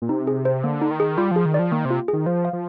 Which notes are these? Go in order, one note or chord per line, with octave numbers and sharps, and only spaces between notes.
A#2
C3 D#4
G#4
C5
D3 A#3
D#4
D#3
G#4
G3 F4
F3 G#4
D#3
F3 D5
D#3 A#3
C3
F4
D#3 G#4
F3 C5
F5
F3